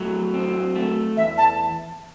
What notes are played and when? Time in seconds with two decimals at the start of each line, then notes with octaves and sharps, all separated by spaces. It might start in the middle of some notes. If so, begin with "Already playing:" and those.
Already playing: F#3 A3
0.34 C4
0.75 A3
1.17 E2 E5
1.38 A5